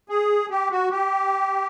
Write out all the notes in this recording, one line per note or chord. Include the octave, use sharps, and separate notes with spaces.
G#4
G4
F#4
G4